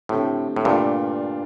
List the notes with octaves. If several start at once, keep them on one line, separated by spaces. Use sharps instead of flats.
A2 D3 A3 C4 G4
A2
G2 A#2 D3 A3 D4 F4